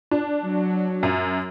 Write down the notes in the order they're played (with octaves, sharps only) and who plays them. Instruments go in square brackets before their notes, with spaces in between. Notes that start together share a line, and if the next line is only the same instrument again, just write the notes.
[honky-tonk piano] D4
[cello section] F#3
[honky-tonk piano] F#2